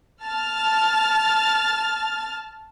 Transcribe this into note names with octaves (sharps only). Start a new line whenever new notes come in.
A5 F6 A6